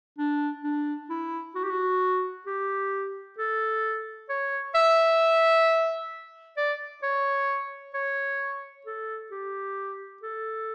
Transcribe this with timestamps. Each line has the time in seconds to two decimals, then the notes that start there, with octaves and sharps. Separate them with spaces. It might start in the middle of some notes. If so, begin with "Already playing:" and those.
0.18 D4
0.64 D4
1.09 E4
1.55 F#4
1.63 G4
1.70 F#4
2.46 G4
3.38 A4
4.29 C#5
4.75 E5
6.57 D5
7.03 C#5
7.94 C#5
8.86 A4
9.31 G4
10.22 A4